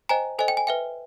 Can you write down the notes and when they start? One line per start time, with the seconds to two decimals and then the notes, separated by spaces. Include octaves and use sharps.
0.09 C5 D#5 G5 G#5 A#5
0.39 A4 C5 D#5 G#5
0.48 G5
0.57 G#5
0.67 B4 E5 G5